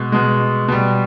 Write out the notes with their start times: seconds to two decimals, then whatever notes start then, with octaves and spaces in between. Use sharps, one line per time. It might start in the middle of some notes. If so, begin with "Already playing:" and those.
Already playing: B2 G#3
0.12 B2 G#3
0.68 B2 G3